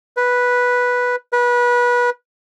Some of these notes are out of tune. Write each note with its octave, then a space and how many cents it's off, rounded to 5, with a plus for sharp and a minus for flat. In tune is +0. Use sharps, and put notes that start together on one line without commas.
B4 -5
B4 -25